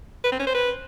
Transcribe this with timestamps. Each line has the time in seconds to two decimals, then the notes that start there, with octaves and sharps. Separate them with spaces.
0.24 B4
0.32 C4
0.39 C#4
0.47 C5
0.55 B4